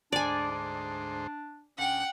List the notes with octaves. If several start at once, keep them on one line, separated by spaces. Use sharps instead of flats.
D2 G#2 D4 C5 D5 G#5
D4
D2 C#4 F#5 G5